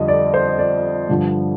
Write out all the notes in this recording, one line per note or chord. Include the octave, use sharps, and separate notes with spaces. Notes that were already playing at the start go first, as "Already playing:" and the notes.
Already playing: F2 D3 G3 F4 D#5
D5
C5
D#5
D5
G2 D3 F3